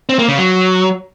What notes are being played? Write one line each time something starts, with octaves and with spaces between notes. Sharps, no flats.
C4
A#3
C#3
F#3